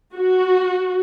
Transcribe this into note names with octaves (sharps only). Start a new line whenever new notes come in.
F#4